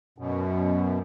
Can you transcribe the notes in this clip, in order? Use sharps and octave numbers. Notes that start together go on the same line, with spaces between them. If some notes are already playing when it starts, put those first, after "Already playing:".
F#2 B2